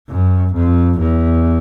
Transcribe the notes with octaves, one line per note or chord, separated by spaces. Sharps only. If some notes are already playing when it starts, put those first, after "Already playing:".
F#2
F2
E2